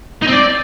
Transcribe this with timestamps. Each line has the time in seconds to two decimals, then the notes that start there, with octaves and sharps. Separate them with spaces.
0.22 D#4
0.27 C4
0.32 D5